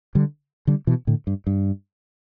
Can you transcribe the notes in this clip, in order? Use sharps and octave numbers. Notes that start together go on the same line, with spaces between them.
D3 G3
D3 G3
B2 E3
A2 D3
G2
G2